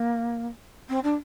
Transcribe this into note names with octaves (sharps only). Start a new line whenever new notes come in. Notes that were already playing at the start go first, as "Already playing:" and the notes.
Already playing: A#3
C4
D4